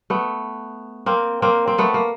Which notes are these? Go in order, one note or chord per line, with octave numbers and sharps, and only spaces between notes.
A3 B3
A#3 C4
A#3 C4
C4
A3 B3
A#3